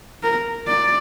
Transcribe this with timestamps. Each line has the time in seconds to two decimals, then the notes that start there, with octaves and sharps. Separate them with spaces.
0.23 A#4
0.68 D5